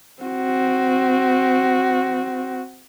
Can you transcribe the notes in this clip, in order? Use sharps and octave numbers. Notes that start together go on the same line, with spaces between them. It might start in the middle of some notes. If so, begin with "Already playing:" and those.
C4 F#4